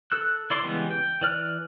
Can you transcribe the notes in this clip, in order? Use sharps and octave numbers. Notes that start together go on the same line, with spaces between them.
A4 E6 F#6
E4 D5 C6 D6
C#3 E3 G3 G#3 B3
G5
E3 D5 F6 F#6